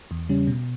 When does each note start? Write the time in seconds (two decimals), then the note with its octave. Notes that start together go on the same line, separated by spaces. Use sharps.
0.11 E2
0.29 C#3 G3 C#4
0.47 B2